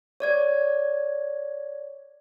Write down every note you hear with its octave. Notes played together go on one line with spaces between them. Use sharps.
C#5 D5 G#6